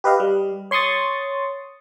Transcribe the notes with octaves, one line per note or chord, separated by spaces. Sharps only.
G4 B4 D#5 F5
G3
C#5 C6 C#6 D#6 A6